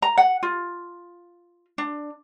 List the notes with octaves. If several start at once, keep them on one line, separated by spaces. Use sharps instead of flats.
A#5
F#5
F4
D4